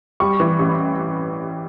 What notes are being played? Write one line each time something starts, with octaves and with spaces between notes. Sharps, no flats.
G3 C#6
E3
A1